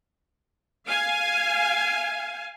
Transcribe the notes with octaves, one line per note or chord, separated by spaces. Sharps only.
F5 G#5